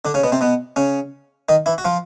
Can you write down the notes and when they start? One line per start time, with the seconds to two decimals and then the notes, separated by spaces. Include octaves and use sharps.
0.05 D3 D4
0.14 C#3 C#4
0.24 B2 B3
0.32 C3 C4
0.41 B2 B3
0.76 C#3 C#4
1.49 D#3 D#4
1.66 E3 E4
1.78 F#4
1.85 F3 F4